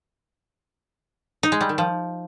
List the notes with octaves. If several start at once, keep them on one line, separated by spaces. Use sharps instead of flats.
D#4
G#3
G3
D#3
F3